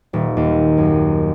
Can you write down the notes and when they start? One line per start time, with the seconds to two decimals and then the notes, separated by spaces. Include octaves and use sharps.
0.13 D#1
0.37 D#2
0.77 F#2